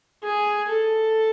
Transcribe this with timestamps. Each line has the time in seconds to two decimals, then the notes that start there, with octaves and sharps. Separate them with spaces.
0.24 G#4
0.69 A4